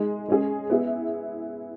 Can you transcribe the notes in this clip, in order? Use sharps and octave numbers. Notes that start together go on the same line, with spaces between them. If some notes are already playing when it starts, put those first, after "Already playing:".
Already playing: G#3 D#4 G#4
G#3 C#4 G#4 D#5
B3 E4 G#4